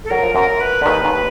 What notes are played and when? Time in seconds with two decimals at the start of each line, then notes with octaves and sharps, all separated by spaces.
0.04 A4
0.10 F#3 A#4
0.23 F3
0.35 F#2 F#3 A#4
0.61 B4
0.81 D3
0.85 D#2 D#3 B4
1.05 D#2 D#3